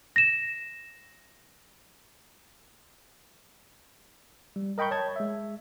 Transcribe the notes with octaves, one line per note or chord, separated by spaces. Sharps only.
A#6 E7
G3
A#4 D#5 G5 B5 C#6 G6
C#5 A5 G#6
G#3 E5